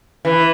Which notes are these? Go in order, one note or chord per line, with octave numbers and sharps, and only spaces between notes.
E3